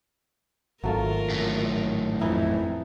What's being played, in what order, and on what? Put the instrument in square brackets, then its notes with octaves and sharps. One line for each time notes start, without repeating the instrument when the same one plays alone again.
[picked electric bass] G#1 [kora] F#3 A3 A#3 [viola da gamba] F4 A#4
[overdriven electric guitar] F#2 A2
[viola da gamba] F2 [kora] E3 D#4 E4